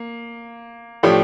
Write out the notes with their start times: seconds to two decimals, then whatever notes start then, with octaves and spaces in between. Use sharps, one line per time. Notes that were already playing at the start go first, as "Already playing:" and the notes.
Already playing: A#3
1.03 A2 F3 A3 D4 G4